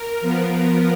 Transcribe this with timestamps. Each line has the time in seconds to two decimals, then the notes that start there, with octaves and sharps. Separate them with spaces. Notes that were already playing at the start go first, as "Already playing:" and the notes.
Already playing: A#4
0.21 F3 B3